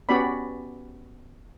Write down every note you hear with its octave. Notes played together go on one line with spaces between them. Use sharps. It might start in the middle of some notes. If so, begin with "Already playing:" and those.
B3 C#4 F#4 G4 D5 B5